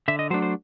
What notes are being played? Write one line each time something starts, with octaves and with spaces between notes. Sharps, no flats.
D3 E5
D#5
F#3 A3 D4 C5
C5